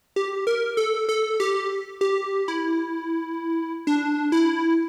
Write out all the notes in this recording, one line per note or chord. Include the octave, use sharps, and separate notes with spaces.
G4
A#4
A4
A4
G4
G4
E4
D4
E4